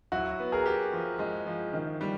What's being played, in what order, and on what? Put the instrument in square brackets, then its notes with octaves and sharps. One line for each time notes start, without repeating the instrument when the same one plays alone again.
[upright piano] F#3 [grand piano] E4 F#4
[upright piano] B3
[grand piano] G#4 A#4
[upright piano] G4
F3
G#3
F3
D#3
G3